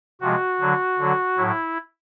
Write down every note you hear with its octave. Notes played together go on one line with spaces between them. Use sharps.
C3 F3 G#3 F#4
D3 F#3
D3 F#3
A2 F#3 E4